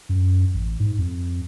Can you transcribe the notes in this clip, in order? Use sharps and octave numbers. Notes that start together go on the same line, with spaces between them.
F#2
A1
G#2
F2